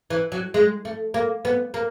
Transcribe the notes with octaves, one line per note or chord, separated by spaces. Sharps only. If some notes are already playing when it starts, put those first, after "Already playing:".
E3
F#3
G#3
A3
A#3
B3
A#3